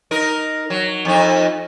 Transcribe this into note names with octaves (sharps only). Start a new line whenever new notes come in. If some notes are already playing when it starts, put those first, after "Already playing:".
D#4 A#4
F#3
F2 D#4